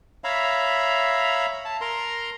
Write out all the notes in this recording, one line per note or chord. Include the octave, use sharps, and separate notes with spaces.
C#5 E5 F5 A#5 B5
A5
A#4 A#5 C6